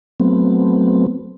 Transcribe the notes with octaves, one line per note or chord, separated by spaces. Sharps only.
F#3 A3 B3 C4